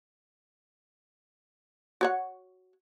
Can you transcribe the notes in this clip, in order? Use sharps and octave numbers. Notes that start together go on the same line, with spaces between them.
F#4 C#5 F#5